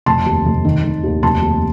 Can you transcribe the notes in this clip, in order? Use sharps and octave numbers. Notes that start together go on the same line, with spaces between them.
F1 A5 C6
D#2
F1
D#3
D#3
D#2
F1 A5 C6
D#2